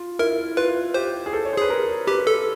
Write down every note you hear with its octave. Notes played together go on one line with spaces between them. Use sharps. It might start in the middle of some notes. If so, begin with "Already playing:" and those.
Already playing: F4
E4 A#4
F4 B4
G4 C5
G#4
A4
C#5
C5
G#4 B4
A#4
G4 B4
A4